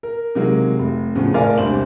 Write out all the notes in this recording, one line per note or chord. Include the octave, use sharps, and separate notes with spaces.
A#4
C3 D#3 F#3 G#3 A#3
F1
E2 A2 C#3 F3
A2 A#4 D5 F5 G#5 F6
E1 C2 D4 C5 F#7